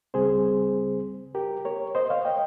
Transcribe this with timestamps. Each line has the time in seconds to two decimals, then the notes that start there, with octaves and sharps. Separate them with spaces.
0.14 C#2 C#3 G3 C4 G#4 C5
1.35 G4 A#4
1.65 A#4 C#5
1.95 C5 D#5
2.10 C#5 F5
2.25 D#5 G5